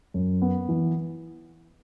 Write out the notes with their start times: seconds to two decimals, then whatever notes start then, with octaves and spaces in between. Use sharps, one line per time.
0.14 F#2
0.42 B3
0.69 E3